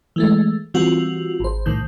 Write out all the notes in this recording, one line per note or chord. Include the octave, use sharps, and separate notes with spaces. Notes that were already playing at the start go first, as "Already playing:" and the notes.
E3 G#3 A3
E3 G3 C4 F4 F#4
G#1 C5
C2 A2 D#3 G6